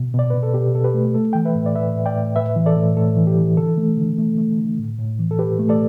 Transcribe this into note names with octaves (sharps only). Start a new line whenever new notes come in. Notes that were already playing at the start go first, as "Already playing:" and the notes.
Already playing: B2
B2 D5
B2 B4
A4
B2 G4
B2 A4
G4 B4
A3
A3 A4
E3 G5
B4 E5
A2
D5
A2 B4 E5
A2
D5 G5
A2
A2 B4 E5
E3
A4 D5
A2
A2 A4
E3
G4
E3
D3 A4
A3
D3
A3
A3
D3
A2
A2
E3
A4
A2 G4 B4
A3
A4 D5